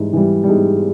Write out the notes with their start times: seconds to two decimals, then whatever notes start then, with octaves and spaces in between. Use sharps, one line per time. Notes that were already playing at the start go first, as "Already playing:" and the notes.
Already playing: G#2 E3 G3
0.13 E3 G3
0.44 G3
0.48 G#2 G#3